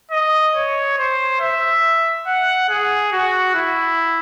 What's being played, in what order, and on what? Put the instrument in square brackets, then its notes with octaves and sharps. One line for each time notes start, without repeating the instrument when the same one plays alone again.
[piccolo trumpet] D#5
C#5
C5
E5
F#5
G#4
F#4
E4